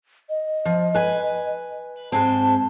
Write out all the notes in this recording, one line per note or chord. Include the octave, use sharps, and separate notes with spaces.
D#5
F3
B4 G#5
G#2 G#3 C4 A5